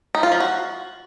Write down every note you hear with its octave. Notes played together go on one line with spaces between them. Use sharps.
D#4
F4
F3
F#4